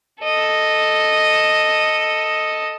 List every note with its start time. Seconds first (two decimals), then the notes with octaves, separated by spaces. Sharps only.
0.23 A4 D#5